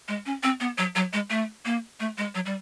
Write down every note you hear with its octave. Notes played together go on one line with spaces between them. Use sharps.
G#3
C#4
C4
B3
F#3
F#3
G#3
A3
A#3
A3
G#3
F#3
G3